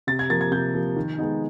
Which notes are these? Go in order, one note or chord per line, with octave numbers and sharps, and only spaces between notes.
C3 A6
G#6
F3 A#3 A6
G#6
C3 G6
F3 A#3
D#3
G#3 B3 D#4